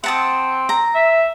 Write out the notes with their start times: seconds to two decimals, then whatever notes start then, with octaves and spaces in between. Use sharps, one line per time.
0.04 C4 F#5 A5 D#6
0.69 A#5
0.95 E5